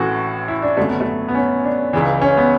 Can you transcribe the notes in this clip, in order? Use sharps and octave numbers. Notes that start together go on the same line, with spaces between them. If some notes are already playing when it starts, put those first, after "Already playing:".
Already playing: A1 A2 E3 F#4 A4
E4
D4
G#1 F#2 D3 F#3 A3
B3
A3
B3
C#4
D4
C#2 C#3 E3
C#4
B3